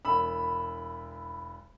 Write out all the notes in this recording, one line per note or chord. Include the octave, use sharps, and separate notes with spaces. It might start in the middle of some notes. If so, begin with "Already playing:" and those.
E1 B5 E6